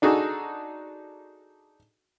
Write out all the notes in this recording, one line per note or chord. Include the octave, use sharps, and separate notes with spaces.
D4 D#4 F#4 G#4 A4